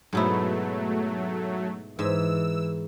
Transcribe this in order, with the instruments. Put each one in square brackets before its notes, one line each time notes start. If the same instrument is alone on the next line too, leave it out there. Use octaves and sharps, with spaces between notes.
[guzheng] G#2 B2 E4 [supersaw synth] F#3 A3
[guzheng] G#2 [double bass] E3 [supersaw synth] E6